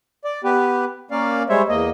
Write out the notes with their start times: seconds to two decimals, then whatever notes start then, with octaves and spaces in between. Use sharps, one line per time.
0.24 D5
0.44 B3 G4 B4
1.11 A#3 C#4 D5 F5
1.49 G3 G#3 C5 C#5 E5
1.69 E2 A#3 D#5